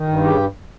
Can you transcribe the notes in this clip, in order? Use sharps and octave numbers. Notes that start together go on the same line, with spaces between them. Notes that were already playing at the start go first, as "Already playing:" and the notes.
Already playing: D#3
G2
C#3 G4